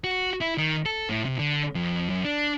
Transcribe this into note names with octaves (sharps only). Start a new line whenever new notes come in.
F#4
E4
D#3
A4
A2
C3
D3
F2
F#2
D4